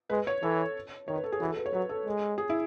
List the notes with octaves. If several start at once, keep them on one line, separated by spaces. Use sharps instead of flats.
G#3 B4
C#5
E3 A4
D#3 C#5
B4
A4
G#4
E3 F#4
A4
B4
C#5
F#3 B4
A4
G#3
G#4
E4